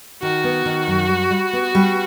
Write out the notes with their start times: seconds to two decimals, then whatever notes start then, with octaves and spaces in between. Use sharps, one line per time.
0.22 D#3 F#4
0.44 B3
0.65 D#3
0.87 F#2
1.09 G3
1.30 G3
1.53 B3
1.75 G3